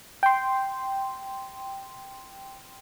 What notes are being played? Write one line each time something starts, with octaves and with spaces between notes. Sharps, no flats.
G5 C6